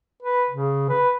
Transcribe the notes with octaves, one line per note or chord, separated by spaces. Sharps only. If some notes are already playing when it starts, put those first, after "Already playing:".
B4
C#3
B4